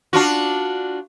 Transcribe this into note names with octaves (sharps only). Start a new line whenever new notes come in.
D4 F4 F#4